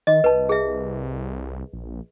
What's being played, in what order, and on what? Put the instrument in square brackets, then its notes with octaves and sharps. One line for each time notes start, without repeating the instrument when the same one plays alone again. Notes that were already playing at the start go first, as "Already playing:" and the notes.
[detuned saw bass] D#3 [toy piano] D#5
[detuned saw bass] C2 [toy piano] B4 A5
[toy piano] G#4 E5
[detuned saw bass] A#1